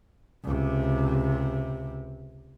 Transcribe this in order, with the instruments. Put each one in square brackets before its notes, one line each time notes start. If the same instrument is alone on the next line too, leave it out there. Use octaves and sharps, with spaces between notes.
[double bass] C#2 C3